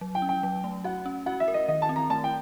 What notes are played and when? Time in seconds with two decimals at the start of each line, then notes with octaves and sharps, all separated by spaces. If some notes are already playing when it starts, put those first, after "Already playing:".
0.01 F#3
0.15 G5
0.22 C#4
0.29 G5
0.43 F#3
0.64 A3
0.84 F#4 F#5
1.06 C#4
1.26 F#4 F#5
1.40 E5
1.48 A#4
1.54 D#5
1.68 D#3 D#5
1.82 A5
1.89 C4
1.96 A#5
2.10 A3 A5
2.24 G5